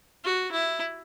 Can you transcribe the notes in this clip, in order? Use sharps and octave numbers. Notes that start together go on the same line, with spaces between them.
F#4
E4